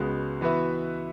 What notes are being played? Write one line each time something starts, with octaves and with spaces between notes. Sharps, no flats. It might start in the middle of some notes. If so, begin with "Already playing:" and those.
Already playing: C#2 C#3 G#3 B3 F#4
E3 B3 F#4 B4 E5